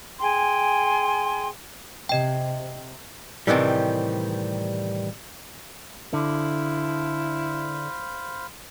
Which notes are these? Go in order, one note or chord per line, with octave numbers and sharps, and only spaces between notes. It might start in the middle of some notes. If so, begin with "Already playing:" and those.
G#4 G5 G#5 C6
C3 D#5 G5
A2 C3 D#3 E3 G3
D3 E4 C5 F5 B5